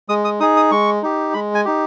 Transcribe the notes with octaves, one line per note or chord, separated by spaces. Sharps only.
G#3 D#6
D#6
D#4 G#4 D#6
D#6
G#3 C#6
D#4 G4
G#3 B5
G#5
D#4 G4